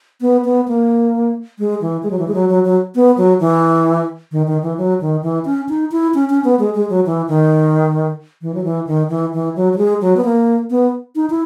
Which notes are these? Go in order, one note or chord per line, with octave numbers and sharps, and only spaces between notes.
B3
B3
A#3
G#3
E3
G#3
F#3
E3
G#3
F#3
F#3
F#3
B3
F#3
E3
D#3
D#3
E3
F#3
D#3
E3
C#4
D#4
E4
C#4
C#4
B3
G#3
G#3
F#3
E3
D#3
E3
F#3
E3
D#3
E3
E3
F#3
F#3
G#3
F#3
B3
A#3
B3
D#4
E4